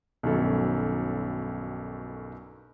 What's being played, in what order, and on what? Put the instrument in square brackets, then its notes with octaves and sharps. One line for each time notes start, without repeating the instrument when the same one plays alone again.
[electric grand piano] B1 G2 D#3 F#3 C#4 A4